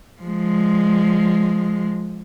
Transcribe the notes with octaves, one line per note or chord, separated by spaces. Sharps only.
F3 G#3